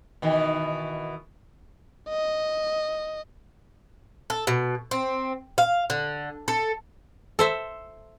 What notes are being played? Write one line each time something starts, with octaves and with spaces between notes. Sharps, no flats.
B2 D#3 E3
D#5
A4
B2
C4
F5
D3
A4
A4 C5 E5